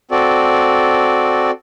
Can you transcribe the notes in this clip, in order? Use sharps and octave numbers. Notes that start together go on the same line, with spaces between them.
C4 F#4 A4 D5